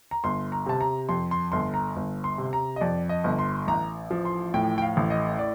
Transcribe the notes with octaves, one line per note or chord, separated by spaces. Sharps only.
A#5
G1 C6
A#5
C3 A5
A#5
F2 C6
C6
G1 C6
A#5
G1
C6
C3
A#5
D#5
F2 D5
D#5
G1
C6
A1 A#5
F3
C6
A2 G5
G5
F5
A1
D#5
D5